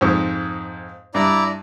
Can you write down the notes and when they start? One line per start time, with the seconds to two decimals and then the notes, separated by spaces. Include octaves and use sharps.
0.01 F2 G#2
1.14 G2 E4 D5 A#5